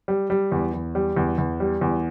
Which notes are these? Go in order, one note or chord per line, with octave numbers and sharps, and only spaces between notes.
G3
G3
E2
E2
G3
E2
E2
G3
E2